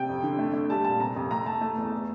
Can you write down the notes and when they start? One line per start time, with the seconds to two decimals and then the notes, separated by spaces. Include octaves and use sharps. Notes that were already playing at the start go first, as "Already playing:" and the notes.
Already playing: C3 G5
0.09 F2
0.24 D3
0.39 A3
0.54 A3
0.70 G3 A5
0.84 A#2 A5
1.00 C3 A#5
1.16 F2
1.31 A3 A#5
1.46 A3 A5
1.61 A3
1.77 E2
1.92 A3